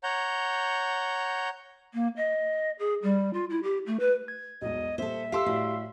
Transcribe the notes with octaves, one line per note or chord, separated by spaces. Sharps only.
C#5 F#5 A#5 G6
A#3
D#5
G#4
G3
F4
E4
G4
A3
B4
G#6
E1 B1 D#5
A#2 G3 A4 C5 E5
G4 A4 F5 C6 E6
A2 G3 F#4 D5